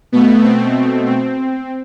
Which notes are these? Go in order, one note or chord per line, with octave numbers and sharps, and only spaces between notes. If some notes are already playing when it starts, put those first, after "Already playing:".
B2 A3 B3
C4
C4